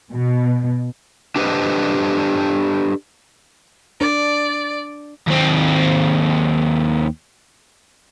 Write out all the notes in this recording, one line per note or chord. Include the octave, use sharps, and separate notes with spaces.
B2
D4 G4 A4 B4 C5 D#5
D4 D5
D#2 C4